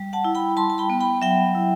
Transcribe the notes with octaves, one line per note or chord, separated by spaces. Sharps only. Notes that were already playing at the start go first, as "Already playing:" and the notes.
Already playing: G3
F#5 A5
E4
G5 B5
G3 A5 C6
A5
G5 B5
B3
G5 B5
F#3 E5 G5
E4